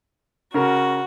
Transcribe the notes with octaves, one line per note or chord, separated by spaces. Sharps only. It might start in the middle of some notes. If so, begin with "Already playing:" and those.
C#3 F#4 A#4